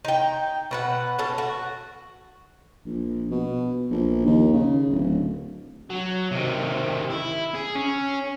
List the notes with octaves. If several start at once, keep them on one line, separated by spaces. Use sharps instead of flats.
D#4 G5
B2 B4 F#5
B2 C#4 A4
F#4
A#1
B2
A#1
D#2
C#3
D1
F#3
C3 D#3
E4
G#4
C#4